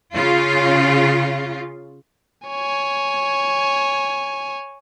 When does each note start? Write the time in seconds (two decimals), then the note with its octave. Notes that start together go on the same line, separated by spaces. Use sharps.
0.13 C#3 F4
2.48 C#5 G#5